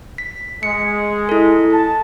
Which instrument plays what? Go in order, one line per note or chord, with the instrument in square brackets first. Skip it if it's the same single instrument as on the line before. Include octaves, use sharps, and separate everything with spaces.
[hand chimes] B6
[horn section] G#3 [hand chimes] C#7
[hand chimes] E4 A4
[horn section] A5